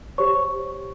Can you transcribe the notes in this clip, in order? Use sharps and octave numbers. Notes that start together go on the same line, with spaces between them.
G4 C5 C#5 C#6